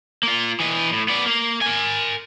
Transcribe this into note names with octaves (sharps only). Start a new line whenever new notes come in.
A#3 F4
E3 D#5
A2
B3 D5
A#3
A#4 G#5